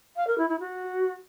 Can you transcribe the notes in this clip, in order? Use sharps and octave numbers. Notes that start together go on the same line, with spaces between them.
F5
A#4
E4
E4
F#4